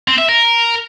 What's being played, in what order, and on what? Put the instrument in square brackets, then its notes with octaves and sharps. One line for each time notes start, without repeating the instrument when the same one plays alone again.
[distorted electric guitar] C4
E5
A#4